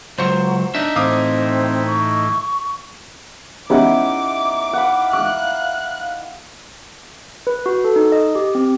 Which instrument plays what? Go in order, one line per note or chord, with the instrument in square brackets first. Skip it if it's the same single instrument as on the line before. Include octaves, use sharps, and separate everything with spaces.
[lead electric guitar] C#2 F#3 [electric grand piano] C5
[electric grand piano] D4 [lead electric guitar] D#4 E5
[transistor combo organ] A2 E3 [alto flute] C4 [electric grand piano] F5 D6 D#6
[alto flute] C#6
[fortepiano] B3 C#4 G4 [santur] D#4 E4 F#5 [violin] D6
[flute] F5 [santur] F#5 B5
[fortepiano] D6 [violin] F#6
[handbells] B4
F#4
A4
D#4
D#5
G4
C4